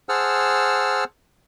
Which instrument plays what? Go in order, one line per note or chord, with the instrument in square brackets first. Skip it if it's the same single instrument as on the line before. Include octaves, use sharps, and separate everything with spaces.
[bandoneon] G#4 C5 F#5 A5 E6 F6